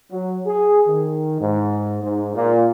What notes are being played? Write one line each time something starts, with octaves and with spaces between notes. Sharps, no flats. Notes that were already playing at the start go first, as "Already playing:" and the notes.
F#3
G#4
D#3
G#2
G#2
A#2